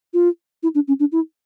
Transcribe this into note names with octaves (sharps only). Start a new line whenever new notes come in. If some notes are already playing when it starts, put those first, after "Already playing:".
F4
E4
D4
C#4
D4
E4